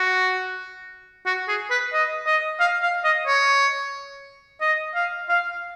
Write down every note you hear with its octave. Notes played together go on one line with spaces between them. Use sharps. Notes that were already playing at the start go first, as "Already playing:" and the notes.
Already playing: F#4
F#4
G#4
B4
D#5
D#5
F5
F5
D#5
C#5
D#5
F5
F5